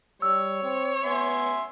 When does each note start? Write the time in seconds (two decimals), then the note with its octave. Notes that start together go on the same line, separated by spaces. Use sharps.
0.22 G3 C#5 E6
0.63 C4
1.04 B3 E5 G#5 C6